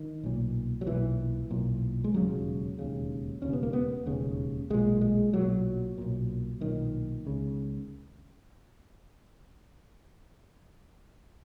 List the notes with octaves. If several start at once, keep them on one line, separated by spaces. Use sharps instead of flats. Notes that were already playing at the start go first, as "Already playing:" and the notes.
Already playing: D#3
B1 A#2
F#3
B1 A#2 E3
B1 A#2
G#3
E1 D#2 C#3 F#3
E1 D#2 C#3
E1 D#2 C#3 C#4
B3
A#3
B3
E1 D#2 C#3
B1 A#2 G#3
G#3
B1 A#2 F#3
B1 A#2
B1 A#2 D#3
C#2 C#3